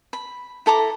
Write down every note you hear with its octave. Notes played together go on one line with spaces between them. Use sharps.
B5
E4 A4 A#5 D6